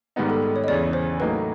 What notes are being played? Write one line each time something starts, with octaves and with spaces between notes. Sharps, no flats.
G#2 D#3 G3 B3 D#4
A4
G#4
C#5
D#5
E2 C#3 E3 D5
C5
A2 F#3 A#3 D#4 B4